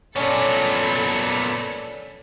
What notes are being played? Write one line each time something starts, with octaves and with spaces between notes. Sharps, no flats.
A#2 B3 C#4 D4 A4 B5